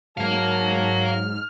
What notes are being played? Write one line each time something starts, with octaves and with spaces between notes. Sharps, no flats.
G#2 F#3 A#4 F5 A5
F6